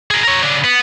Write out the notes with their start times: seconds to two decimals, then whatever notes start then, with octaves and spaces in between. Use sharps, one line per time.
0.11 G#4 A#4
0.23 A#4 C#5
0.43 C#3 D4
0.65 B3